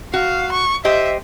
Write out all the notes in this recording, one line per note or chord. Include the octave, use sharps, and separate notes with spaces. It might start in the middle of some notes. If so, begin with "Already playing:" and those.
F#4 F5
C#6
G4 C5 D#5 E5